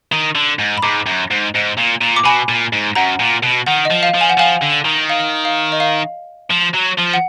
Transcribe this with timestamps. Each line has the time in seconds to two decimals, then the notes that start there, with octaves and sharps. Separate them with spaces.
0.13 D#3
0.35 D3
0.59 G#2
0.78 B5
0.82 G#2 A#5 D6
1.06 F#2
1.31 G#2
1.55 G#2
1.77 A#2
2.01 A#2
2.16 D6
2.25 B2 G#5 B5
2.49 A#2
2.73 G#2
2.95 F#2 F#5 A#5
3.20 A#2
3.43 B2
3.66 D#3 F#5
3.85 D#5
3.90 F3
4.03 F5
4.14 F3
4.21 G#5
4.30 F#5
4.38 F3 F5 G#5
4.62 D3
4.86 D#3
5.10 F5
5.45 F5
5.72 D#5
5.80 F5
6.51 F3
6.74 F#3
6.99 F3
7.14 F#5